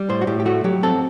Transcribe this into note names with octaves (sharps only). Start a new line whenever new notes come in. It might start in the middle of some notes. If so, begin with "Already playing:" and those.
Already playing: G3
A2 C5
F#4
A2 G4
G4
A3 F#4
F#3 G4
C4 A4